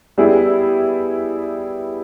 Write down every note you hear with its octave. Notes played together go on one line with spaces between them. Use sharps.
G3 B3 E4 G#4